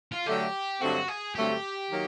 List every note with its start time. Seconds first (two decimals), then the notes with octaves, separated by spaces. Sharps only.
0.12 F4
0.26 D3 F#3 A3 G4
0.81 G2 D3 F#3 A3 C4 F#4
1.08 G#4
1.35 G2 D3 F#3 A3 C4 G4
1.90 D#3 F#3 A#3 D#4